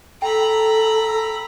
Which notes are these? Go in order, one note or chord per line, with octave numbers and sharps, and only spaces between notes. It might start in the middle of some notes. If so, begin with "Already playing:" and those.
A4 G5 A#5 B5